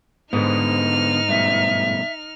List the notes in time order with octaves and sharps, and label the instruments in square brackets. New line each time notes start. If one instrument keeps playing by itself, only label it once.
[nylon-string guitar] G#2 C5 [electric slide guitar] D3 B3 [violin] D#4 F6
[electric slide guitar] G2 B2 [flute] E5